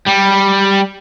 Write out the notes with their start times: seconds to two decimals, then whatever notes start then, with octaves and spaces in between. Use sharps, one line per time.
0.07 G3